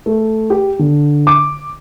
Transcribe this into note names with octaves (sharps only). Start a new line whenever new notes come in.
A3
G4
D3
D6